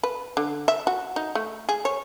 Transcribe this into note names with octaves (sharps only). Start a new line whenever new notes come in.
B4
D3
E5
F#4
D#4
A3
G#4
C#5